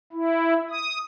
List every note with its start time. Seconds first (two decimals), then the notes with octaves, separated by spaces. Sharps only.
0.13 E4
0.71 D#6